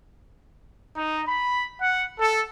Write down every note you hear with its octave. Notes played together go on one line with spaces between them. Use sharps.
D#4
B5
F#5
A4